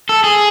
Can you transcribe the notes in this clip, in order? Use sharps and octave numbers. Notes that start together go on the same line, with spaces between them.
A4
G#4